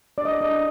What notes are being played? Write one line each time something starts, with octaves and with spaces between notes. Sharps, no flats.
D4 D5
D#5
D5
D4 D#5